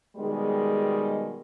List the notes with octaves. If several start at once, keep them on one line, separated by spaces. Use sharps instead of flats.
B2 D#3 G3 G#3